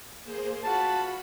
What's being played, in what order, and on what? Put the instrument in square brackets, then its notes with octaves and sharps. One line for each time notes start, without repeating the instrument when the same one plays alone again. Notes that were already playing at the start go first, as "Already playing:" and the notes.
[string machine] A#3 G#4 C5
[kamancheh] F4 F#4 [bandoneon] A5 [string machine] B5